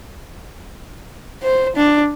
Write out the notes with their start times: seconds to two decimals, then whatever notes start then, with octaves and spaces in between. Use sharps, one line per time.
1.43 C5
1.76 D4